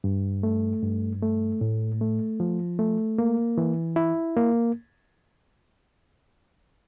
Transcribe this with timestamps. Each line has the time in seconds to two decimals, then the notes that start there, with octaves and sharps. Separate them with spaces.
0.04 G2
0.43 A3
0.83 G2
1.22 A3
1.61 A2
2.01 A3
2.40 F3
2.79 A3
3.18 A#3
3.58 E3
3.96 E4
4.37 A#3